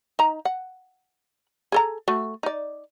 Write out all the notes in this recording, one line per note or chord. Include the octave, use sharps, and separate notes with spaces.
D#4 A#5
F#5
G#4 A4 A#5
A3 F#4
D#4 D5